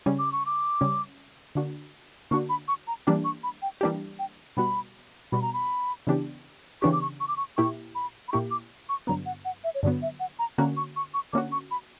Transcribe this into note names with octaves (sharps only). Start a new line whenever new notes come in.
C#3 G3 C#4
D6
C#6
D6
C#3 G3 C#4
D3 A#3 D4 F#4
D3 A#3 D4 F#4 C#6
B5
C#6
A#5
E3 G3 A#3 D4 G4
C#6
B5
G5
E3 G3 A#3 D4 G4
G5
B2 G3 B3 F#4 B5
B2 G3 B3 F#4 B5
A#5
B5
C#3 E3 B3 D4 G4
C#3 E3 B3 D4 G4 C#6
D6
C#6
C#6
D6
C#6
A#2 A#3 E4 G4 C#6
B5
B5
A#2 A#3 E4 G4 C#6
D6
C#6
G2 D3 F#3 B3 A#5
F#5
F#5
E5
C#5
G2 D3 F#3 B3 D5
E5
F#5
A#5
D3 A#3 C#4 F#4 A#5
C#6
C#6
C#6
D3 A#3 C#4 F#4 D6
C#6
B5